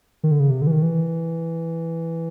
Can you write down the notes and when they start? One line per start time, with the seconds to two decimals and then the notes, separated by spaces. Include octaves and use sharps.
0.23 D#3
0.31 D3
0.40 C#3
0.50 C3
0.62 D3
0.67 E3
0.72 D#3
0.82 E3